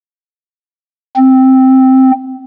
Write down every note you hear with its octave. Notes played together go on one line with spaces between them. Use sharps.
C4